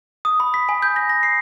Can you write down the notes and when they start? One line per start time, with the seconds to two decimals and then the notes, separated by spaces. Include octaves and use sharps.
0.25 D#6
0.40 B5
0.54 B6
0.69 G#5
0.82 G6
0.96 A#6
1.09 A#6
1.23 C7